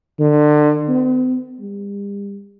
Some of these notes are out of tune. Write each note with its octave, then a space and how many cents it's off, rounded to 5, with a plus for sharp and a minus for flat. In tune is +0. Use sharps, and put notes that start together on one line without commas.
D3 +30
C4 -45
G3 +40